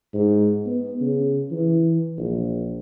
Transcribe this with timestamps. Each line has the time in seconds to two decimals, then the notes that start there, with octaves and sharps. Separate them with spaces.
0.14 G#2
0.66 B3
1.01 C#3
1.51 E3
2.18 A#1